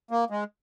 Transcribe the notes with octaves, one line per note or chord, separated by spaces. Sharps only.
A#3
G#3